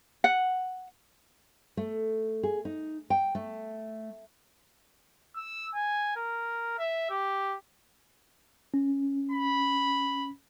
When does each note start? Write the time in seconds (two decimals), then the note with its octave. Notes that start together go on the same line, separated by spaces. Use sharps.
0.24 F#5
1.77 A3
2.43 G#4
2.65 D#4
3.10 G5
3.35 A3
5.36 E6
5.74 G#5
6.16 A#4
6.79 E5
7.10 G4
8.74 C#4
9.31 B5